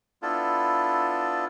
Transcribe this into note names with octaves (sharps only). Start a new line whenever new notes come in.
B3 D4 E4 F4 A4